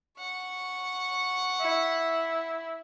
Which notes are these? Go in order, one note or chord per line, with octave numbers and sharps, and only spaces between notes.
F#5 C#6
E4